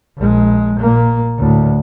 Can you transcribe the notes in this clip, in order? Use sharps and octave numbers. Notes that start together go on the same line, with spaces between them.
A#1 G#3
A#2 A#3
D2 A2